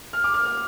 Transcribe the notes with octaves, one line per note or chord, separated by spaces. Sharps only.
F6
D6
F6
F6